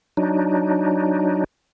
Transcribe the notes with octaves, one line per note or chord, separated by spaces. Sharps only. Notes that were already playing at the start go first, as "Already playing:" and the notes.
F#3 D4 D#4